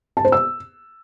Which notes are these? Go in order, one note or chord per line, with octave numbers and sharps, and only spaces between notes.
A5
C5
E6